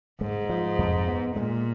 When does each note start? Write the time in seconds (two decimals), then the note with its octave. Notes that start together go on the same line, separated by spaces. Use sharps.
0.21 G#2 G#3
0.49 F3
0.79 F2
1.08 B3
1.36 A#2 G#3